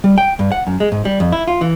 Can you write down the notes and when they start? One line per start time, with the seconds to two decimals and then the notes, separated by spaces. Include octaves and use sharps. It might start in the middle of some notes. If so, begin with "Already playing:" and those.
0.04 G3
0.18 G5
0.39 G2
0.52 F#5
0.67 F#2
0.80 G#3
0.92 G#2
1.05 G3
1.20 F2
1.32 E4
1.48 F4
1.61 E3